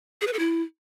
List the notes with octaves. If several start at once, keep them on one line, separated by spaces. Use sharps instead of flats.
G#4
B4
A4
E4